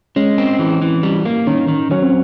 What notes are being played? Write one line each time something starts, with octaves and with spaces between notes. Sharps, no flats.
G#3 C#4
C4
E3
E3
G3
A#3
D#3 C#4
D#3
F#3 C#4
C4